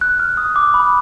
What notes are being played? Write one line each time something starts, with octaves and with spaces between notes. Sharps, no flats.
F#6
F6
D#6
D6
B5